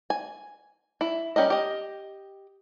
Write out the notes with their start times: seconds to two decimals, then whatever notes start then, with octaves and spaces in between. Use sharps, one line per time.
0.10 G#5
1.01 E4
1.36 G3 C#4 G4 A#4 D#5
1.50 G4 D#5